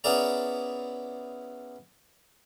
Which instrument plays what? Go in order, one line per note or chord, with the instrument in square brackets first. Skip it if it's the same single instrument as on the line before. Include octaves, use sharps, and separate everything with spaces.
[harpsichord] B3 C#4 E4 G#4 D5 A#5